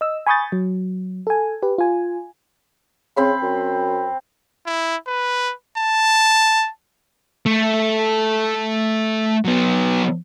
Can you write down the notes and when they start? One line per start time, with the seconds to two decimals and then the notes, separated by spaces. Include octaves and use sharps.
0.01 D#5 E6
0.27 G#5 B5 C#6 D#6 G6 A6
0.52 F#3
1.27 A4 G#5
1.63 G4 B4
1.78 F4 G#5
3.16 C#3 C4 B5 C6
3.42 F#2
4.66 E4
5.07 B4
5.78 A5
7.46 A3
9.45 F#3 B3